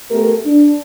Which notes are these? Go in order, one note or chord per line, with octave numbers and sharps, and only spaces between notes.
A3 B3 G4 A4 A#4
D4